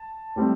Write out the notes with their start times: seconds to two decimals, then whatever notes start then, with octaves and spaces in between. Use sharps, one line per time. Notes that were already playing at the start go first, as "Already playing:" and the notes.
Already playing: A5
0.36 A2 G3 C4